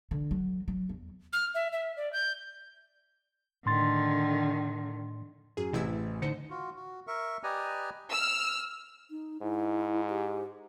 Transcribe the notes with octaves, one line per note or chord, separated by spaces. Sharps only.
D3
F#3
F#3
E2
F6
E5
E5
D5
G6
A2 D3 D#3 C6 A6
F#2 G#4
A1 C3 E3 E4 E6
D3 D#4 C5 C#7
F4 F#4
F#4
A#4 E5 C#6
G4 B4 D5 D#5 G#5 A#5
E6 F6
D#4
G#2 E4
G4